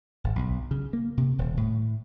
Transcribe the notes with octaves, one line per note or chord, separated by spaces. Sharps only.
G#1
B1
C#3
A#3
C3
D#1
A2